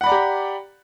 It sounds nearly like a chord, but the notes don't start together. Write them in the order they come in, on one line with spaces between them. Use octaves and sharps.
F#5 B5 D5 A#5 G4